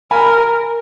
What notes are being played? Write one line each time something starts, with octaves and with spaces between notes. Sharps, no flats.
A#4 G#5 B5